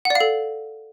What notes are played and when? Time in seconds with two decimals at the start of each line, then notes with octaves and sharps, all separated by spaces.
0.05 F#5
0.10 D5
0.15 F5
0.20 A4